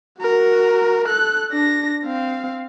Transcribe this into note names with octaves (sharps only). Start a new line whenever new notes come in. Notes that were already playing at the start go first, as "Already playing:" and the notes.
F#4 A#4
A4 F#6
D4 A#6
C4 F5